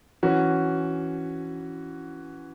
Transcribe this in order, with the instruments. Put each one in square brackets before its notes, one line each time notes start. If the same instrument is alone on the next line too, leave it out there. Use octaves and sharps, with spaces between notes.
[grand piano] E3 C#4 F#4